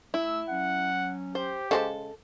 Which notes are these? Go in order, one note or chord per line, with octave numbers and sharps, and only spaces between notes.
A3 E4 E6
F#3 C#4 F#5
G4 C5
C#3 G#3 A4 C5